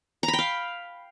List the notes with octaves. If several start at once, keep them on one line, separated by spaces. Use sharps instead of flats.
A#5
B5
G5
F5